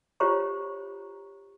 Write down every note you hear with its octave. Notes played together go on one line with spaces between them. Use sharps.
F4 G4 C5 C#5 A#5 C#6